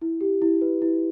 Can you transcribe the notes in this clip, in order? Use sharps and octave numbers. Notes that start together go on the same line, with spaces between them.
E4
G4
E4
B4
E4